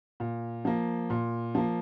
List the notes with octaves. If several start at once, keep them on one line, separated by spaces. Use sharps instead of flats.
A#2
F3 A#3
A#2
F3 A#3